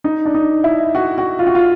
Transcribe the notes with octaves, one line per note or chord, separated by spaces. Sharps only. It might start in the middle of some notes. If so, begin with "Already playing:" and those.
D#4
D4
D#4
E4
F#4
F#4
F4
F#4
F4